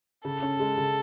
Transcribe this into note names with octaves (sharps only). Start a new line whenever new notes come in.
C#3 A4
C#4
G#3
C#3